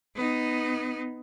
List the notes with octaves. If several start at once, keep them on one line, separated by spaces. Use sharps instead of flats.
B3 D#4